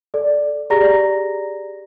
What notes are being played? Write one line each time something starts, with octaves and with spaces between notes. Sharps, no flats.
A4 D5
G4 G#4 D5 A#5 A#6